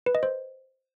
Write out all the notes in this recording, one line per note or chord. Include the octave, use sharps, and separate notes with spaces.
B4
D#5
C5